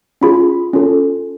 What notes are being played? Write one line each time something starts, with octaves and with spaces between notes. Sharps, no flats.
C#4 F4 G#4 B5
C#4 F4 A4